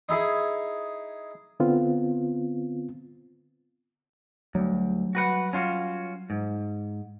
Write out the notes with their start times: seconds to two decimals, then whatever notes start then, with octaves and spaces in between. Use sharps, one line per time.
0.09 D#4 E4 G#4
1.60 D3 B3 C4 F4
4.55 D2 F#3 G3
5.15 F#4 B4 F#5
5.53 C#4 F4 F#4
6.30 G#2